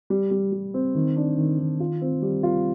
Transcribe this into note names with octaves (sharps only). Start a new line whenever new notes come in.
G3
G3
G3
C4
D#3
D4
D#3
D#3
F4
C4
G3
F4